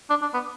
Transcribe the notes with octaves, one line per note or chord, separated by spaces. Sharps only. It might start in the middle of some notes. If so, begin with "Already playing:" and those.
D4
D4
B3